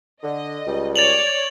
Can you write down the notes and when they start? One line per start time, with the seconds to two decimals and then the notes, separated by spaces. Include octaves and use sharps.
0.24 D3 D#5
0.66 C#2 G3
0.96 C#5 D5 A6 F7 F#7